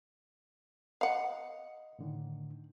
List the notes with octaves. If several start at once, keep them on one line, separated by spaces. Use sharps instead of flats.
D#5 F5 F#5
A2 D3 D#3